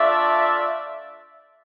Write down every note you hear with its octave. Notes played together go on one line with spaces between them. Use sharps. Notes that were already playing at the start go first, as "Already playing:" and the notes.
Already playing: A3 D4 F4 D5 E5